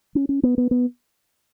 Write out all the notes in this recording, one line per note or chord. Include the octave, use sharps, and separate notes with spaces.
C#4
C#4
B3
B3
B3